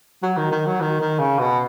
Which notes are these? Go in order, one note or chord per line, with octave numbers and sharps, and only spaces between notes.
F#3
D#3
D#3
F#3
D#3
D#3
C#3
B2